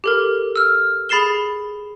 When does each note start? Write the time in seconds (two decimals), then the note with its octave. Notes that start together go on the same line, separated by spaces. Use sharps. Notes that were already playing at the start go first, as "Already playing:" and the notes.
0.04 G4 A4 A#4
0.56 E6 F6
1.09 G#4 B5 A6 C7 E7 G7